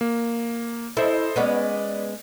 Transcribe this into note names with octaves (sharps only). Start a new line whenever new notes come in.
A#3
E4 A4 C5 D#5
G#3 B3 C#4 B4 D5